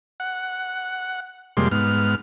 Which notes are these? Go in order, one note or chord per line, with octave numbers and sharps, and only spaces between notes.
F#5
F2 C3 G3 G#3 A#3 C6
G#2 B3 F6